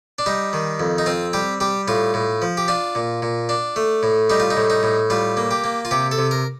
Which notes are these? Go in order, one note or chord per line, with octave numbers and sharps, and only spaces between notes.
D4
G3 D#4
D#3
F2
D#4
C4 F4
G3 G4
G3 G4
A2 F4
A2
F3
G4
D4 F4
A#2
A#2
D4
A3
A2
G3 D#4
F4
D#4
A2
D#4
A2
G3 F4
A#3
G4
A#3
F4
C3 G4
A4
C3
A#4